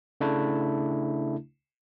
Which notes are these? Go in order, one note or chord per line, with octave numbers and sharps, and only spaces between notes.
C#3 A3 D4 E4